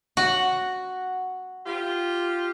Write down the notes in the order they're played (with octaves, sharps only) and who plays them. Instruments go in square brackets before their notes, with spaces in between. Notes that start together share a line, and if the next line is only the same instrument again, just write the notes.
[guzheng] F#4 [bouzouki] F#5
[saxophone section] F4 G4